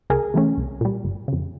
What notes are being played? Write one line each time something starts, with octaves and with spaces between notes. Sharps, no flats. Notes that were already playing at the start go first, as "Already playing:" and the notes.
C#2 G#4 A#4
C3 E3 A3 C#4
C2
A#2 G3
G1
F2 C#3